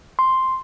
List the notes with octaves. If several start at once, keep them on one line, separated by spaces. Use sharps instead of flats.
C6